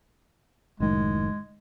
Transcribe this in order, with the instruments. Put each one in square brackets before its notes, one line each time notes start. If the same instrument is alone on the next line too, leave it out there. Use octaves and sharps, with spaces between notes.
[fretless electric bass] F#1 A2 D#3 [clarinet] G#3